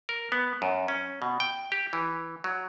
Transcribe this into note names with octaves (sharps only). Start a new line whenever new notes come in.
A#4
B3
F#2
C#4
B2
G5
G4
E3
F#3